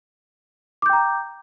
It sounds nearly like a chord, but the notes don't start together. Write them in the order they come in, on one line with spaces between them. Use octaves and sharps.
D6 G6 G5 A#5